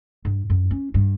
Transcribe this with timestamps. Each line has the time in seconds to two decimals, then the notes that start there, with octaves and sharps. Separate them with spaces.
0.25 G2
0.50 F#2
0.71 C#4
0.94 G2